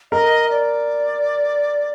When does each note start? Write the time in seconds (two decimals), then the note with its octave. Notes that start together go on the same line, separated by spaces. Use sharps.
0.12 A#4 D#5
0.50 D5